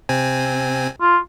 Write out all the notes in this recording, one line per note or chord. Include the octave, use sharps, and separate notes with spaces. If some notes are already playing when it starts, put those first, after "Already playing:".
C3 C4 G#5
F4